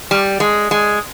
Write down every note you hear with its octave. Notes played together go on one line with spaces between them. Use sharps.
G3
G#3
G#3